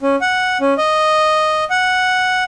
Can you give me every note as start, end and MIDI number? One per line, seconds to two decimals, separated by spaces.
0.01 0.16 61
0.21 0.58 78
0.61 0.74 61
0.78 1.64 75
1.70 2.44 78